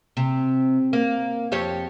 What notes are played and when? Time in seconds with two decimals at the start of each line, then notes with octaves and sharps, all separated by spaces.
0.17 C3
0.93 A#3
1.52 F2 G4 C#5